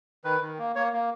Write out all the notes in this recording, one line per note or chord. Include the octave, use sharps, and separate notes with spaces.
D#3 B4
D#3
A#3
A#3 C#5
A#3